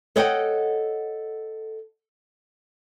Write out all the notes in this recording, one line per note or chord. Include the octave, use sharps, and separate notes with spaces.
A4 C#5 D#5 F#5 G5